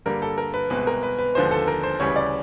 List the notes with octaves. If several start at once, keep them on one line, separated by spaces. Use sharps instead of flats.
G2 D3 G3 A#3 A#4
A4
A#4
B4
C2 B2 G#3 C4 B4
A#4
B4
B4
D#2 D3 F3 G#3 B3 C5
A4
A#4
C5
D2 C#3 E3 G3 C#5
D5